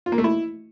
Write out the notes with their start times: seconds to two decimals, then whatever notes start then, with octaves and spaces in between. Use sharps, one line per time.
0.06 F4
0.12 A#3
0.18 A3
0.24 E4